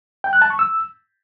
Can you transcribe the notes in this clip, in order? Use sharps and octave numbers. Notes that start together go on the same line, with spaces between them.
G5
F#6
A5
C#6
E6